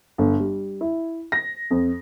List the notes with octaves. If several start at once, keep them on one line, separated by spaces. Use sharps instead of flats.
G1
G3
E4
A#6
F2